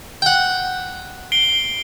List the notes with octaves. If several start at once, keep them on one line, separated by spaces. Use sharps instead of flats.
F#5 G5
C7 D7 G7